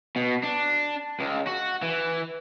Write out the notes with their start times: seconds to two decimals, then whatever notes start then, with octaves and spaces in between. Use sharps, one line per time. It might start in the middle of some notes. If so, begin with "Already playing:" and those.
0.16 B2
0.44 D4
1.19 C#2
1.47 F#4
1.82 E3